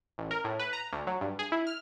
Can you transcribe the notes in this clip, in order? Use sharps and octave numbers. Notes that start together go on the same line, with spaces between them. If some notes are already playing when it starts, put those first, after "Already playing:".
A1
A#4
A2
B4
A#5
D2
F#3
G2
G#4
E4
F6